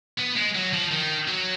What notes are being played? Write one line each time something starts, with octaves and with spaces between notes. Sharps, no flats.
B3
G#3
F#3
F3
D#3
F#3